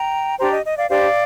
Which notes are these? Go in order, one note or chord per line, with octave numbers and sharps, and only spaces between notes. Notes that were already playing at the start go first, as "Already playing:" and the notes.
Already playing: G5 A#5
D4 G4 C5 G5 A#5
D#5
D#5
D5 F5
D4 G4 C5 D5 F5